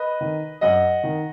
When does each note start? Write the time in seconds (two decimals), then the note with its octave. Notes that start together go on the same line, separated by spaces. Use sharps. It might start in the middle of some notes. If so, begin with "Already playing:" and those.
Already playing: B4 D#5
0.20 D#3
0.61 F#2 D#5 F#5
1.03 D#3